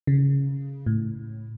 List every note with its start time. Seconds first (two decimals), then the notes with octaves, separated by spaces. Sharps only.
0.07 C#3
0.86 A2